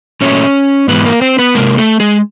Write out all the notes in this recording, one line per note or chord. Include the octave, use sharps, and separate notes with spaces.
A#2 F#3 A3 C#4 C#5
G#2 E3 G#3 B3 B4
A#3 A#4
C4 C5
B3 B4
C3 D#3 G#3 A#3 A#4
A3 A4
G#3 G#4